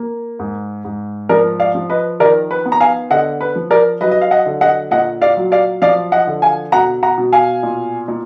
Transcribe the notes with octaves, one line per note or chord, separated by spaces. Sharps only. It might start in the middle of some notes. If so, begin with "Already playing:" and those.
Already playing: A#3
G#2
G#2
F3 A#4 D5
D5 F5
F3
B4 D#5
D#3 A#4 D5
B4
B3
A#5
F5 G#5
D3 D#5 F#5
B4
F3
A#4 D5
F#3 B4 D#5
D#5
F5
D#5 F#5
D3
D#5 F#5
A#2 D#5 F#5
D5 F5
F#3
D5 F5
F3 D5 F5
D#5 F#5
D3
F5 G#5
B2 F#5 A#5
F#5 A#5
B2
F5 G#5
A#2
A#2